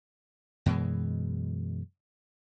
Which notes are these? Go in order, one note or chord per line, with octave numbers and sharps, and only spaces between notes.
F#2 B2 E3 G#3